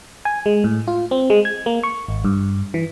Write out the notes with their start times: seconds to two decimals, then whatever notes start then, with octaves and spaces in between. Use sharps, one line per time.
0.25 G#5
0.46 G#3
0.64 A2
0.88 F4
1.11 C4
1.30 G#3
1.45 G#6
1.66 A#3
1.83 C#6
2.08 G#1
2.25 G2
2.74 E3